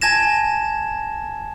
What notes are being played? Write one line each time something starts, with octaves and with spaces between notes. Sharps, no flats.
G#5 A5 G#6 A#6 E7